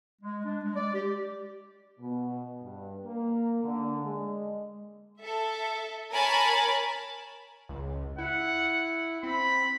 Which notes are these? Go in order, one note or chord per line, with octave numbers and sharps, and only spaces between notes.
G#3
D4
G#3
D5
G4
B2
G2
A#3
D3
G#3
A4 E5
A#4 C#5 G#5 A5 B5
C#2
E4 F#5
C4 B5